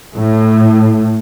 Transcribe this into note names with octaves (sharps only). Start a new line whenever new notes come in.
A2